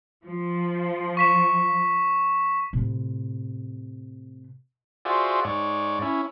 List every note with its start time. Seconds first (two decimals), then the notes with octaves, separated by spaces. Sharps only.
0.25 F3
1.17 C#6 B6 E7
2.73 A2 C3
5.05 F4 F#4 G#4 C5 D5 E5
5.45 G#2 C#5 D5
6.02 C#4 E4